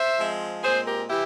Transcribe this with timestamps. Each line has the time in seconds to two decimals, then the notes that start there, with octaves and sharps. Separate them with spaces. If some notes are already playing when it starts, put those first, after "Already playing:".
Already playing: C5 E5
0.16 F3 G#3 C4
0.63 A#2 G#3 C4 G#4 C5
0.86 G4 A#4
1.09 E3 E4 G4